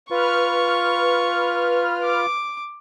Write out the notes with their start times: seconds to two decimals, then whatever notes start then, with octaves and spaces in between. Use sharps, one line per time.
0.10 F4 B4 C#6 F6
2.03 D6